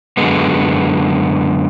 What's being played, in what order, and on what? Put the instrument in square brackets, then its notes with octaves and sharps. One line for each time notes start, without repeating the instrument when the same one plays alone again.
[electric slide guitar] F#2 D3 G#3 B3